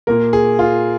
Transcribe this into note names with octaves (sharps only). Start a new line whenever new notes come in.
A#2 A#3 A#4
G#4
F4